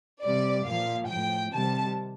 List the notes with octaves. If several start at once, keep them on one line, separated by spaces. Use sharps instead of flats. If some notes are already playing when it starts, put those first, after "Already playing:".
C3 G3 D5
A#2 F3 F5
A2 F3 G5
C3 D#3 G3 A5